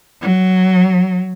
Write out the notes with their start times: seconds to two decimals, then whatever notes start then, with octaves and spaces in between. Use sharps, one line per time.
0.22 F#3